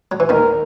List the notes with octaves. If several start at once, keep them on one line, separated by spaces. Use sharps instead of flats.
F#3
E3
D#2 D#3 A#4